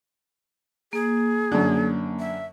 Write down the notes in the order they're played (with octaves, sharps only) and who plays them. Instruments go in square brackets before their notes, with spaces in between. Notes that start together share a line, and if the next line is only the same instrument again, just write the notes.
[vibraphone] A#3 [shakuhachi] G#4
[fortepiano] F#2 D3
[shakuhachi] E5